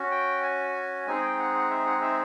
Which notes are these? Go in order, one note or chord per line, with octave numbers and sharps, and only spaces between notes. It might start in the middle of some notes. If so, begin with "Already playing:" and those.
Already playing: C#4 F#4
G5
G#5
G#3 C4 D#4 G#4 G#5
G5
F#5
F#5
E5
F#5
E5